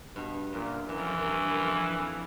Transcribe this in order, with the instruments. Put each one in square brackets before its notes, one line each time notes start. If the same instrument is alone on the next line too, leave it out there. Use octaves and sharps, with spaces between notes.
[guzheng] G2 [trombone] B2
[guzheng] F#2 [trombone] A#2
[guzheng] F#2 [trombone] E3
[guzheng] F2
F#2
F#2
G2
F#2
F2
F2